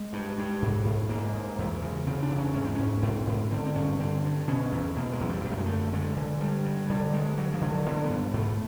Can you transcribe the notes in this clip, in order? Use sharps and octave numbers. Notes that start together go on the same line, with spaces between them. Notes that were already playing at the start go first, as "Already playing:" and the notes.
Already playing: G#3
G2
G2
G#2
G#2
G#2 A#3
G#2
E2
C#3
C#3 C4
D4
E2
C#4
G#2 C#4
C4
G#2 C#4
G#2 C4
G#2
D3 C4
C4
G2 C#4
D3 C4
G2
B2 C#4
E2
B2 A#3
G#3
E2 F#3
G3
F#2 A#3
A3
G#3
D3 A3
D3 G#3
D3
G2 G3
G2
D3 G3
G2 G#3
G2 F#3
F3
D3
F#3
D3 B3
A#3
B3
G2
G#2 A3